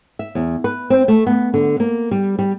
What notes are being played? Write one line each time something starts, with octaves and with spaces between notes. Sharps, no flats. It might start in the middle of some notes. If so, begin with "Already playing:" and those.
E5
E2
B4
C4
A3
B3
D3
A#3
G3
G3